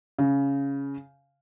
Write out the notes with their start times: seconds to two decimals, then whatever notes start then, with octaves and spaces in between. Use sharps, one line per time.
0.19 C#3